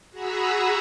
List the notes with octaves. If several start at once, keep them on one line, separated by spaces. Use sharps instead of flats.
F#4 G#4 F#5 A#5 B5 E6